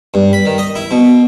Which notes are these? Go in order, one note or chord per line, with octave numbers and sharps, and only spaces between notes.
G2
B5
D#3
D#5
E4
B2